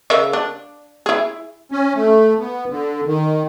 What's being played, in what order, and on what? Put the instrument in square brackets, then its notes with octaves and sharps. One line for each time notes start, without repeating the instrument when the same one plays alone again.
[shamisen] C#3 A#4 E5
D4
E4 G#4
[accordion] C#4
A3
B3
D3
D#3